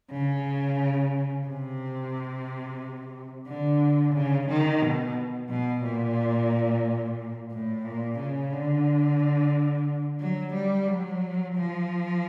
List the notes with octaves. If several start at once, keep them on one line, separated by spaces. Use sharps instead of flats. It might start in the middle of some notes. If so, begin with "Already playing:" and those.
C#3
C3
D3
C#3
D#3
B2
B2
A#2
A2
A#2
C#3
D3
F#3
G3
F#3
F3